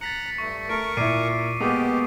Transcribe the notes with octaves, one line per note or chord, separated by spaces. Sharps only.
A#5 F#6 A6 B6 C#7
G2 A3 C#6
A3 A#4 C#6 D7
A#2 E4 D6 C7 D#7
B2 G#3 A#3 B3 G4 C#6 D#6